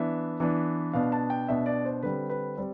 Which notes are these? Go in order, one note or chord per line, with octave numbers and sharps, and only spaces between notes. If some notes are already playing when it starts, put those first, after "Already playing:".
Already playing: E3 B3 D4 E5
E3 B3 D4
B2 B3 D4 F5
A5
G5
B2 B3 D4 E5
D5
C5
D3 G3 C4 B4
B4
G3 C4 C5